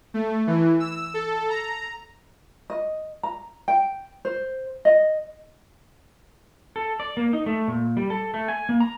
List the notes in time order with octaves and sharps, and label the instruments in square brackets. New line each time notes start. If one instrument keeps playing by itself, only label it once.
[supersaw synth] A3
E3
E6
A4
A#5
[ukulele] D#5
A#5
G5
C5
D#5
[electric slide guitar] A4
D5
A#3
D#4
A3
A#2
G3
A4
A3
G#5
A#3
A#5